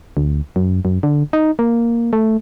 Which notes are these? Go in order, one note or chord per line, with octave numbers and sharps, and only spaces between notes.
D2
F#2
F#2
D3
D#4
A#3
A3